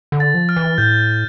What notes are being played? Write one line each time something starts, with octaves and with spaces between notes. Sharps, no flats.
D3
A6
F3
F6
E3
A2 G6